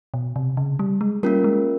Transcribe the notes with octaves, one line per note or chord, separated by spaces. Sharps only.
B2
C3
C#3
G3
G#3
G3 A#3 C#4 F4 A#4
G#3